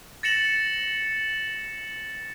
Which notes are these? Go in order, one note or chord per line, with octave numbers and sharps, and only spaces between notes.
A6 A#6 C#7 E7 F#7